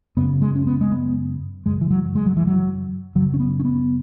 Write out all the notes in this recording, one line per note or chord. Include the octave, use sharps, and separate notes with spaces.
F#2 C#3 B3
G#3
C#4
B3
G#3
B3
F#2 C#3 G#3
E3
F#3
G#3
F#3
E3
F#3
F#2 C#3 F#3
C#4
B3
C#4
B3